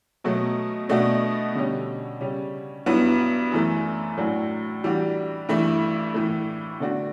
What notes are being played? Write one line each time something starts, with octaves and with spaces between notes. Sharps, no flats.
B2 F#3 A3
B2 A3 D4 F#4
D3 G3 C#4
C#3 G3 C#4
G2 F#3 B3 E4
F#2 E3 A3
A2 F#3 A3 D4 F#4
E3 G3 D4 F#4
G2 E3 A3 E4
A2 E3 A3
D3 A3 D4 F#4